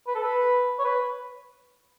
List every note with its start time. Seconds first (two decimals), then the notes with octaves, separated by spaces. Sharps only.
0.07 B4
0.15 A4
0.23 B4
0.79 C#5
0.84 B4